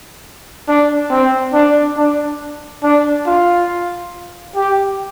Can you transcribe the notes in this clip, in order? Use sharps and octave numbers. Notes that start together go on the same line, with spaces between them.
D4
C4
D4
D4
D4
F4
G4